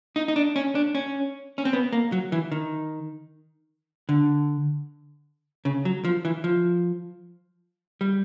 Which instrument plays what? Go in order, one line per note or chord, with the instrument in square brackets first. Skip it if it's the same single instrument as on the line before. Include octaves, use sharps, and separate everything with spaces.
[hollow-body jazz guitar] D#4
D#4
D4
C#4
D4
C#4
C#4
C4
B3
A#3
F#3
E3
D#3
D3
C#3
F#3
F3
E3
F3
G3